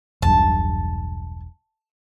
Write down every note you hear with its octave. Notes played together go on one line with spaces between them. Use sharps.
E1 B1 G2 A5